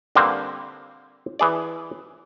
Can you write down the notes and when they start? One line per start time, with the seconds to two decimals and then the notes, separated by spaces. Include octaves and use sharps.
0.15 D3 G3 A#3 C4 B4 C5
1.39 E3 G#4 D5